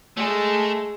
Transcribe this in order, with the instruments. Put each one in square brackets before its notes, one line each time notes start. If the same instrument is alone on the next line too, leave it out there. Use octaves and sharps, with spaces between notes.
[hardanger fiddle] G#3 [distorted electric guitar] A3